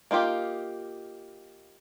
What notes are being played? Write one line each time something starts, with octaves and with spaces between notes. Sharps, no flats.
A#3 D#4 F4 G4